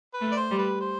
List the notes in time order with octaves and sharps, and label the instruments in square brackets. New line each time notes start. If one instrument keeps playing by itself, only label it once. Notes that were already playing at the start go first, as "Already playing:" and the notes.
[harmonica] B4
[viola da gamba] A3
[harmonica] D5
C5
[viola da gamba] G3
[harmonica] B4
C5